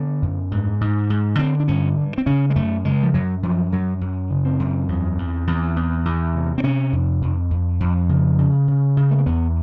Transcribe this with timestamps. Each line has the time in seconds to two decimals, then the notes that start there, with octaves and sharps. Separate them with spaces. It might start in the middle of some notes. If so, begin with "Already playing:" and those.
Already playing: D3 B3
0.22 F#2
0.51 G#2
0.81 G#2
1.10 G#2
1.39 D3 C4
1.60 D4
1.68 G2 C#4
1.97 G2
2.18 C4
2.26 C#3 C#4
2.50 G#3
2.56 F#2 A3
2.84 C#3 G#3
3.03 F3
3.14 F#2 F#3
3.43 F#2 F3
3.72 F#2 F#3
4.01 F#2
4.30 C#3
4.45 C4
4.59 F#2
4.88 E2
5.18 E2
5.47 E2
5.76 E2
6.05 E2
6.35 C3
6.58 C4
6.63 C3 C#4
6.93 F2
7.22 F2
7.51 F2
7.80 F2
8.09 C#3
8.38 C#3
8.68 C#3
8.97 C#3
9.11 A3
9.19 A#3
9.26 E2 B3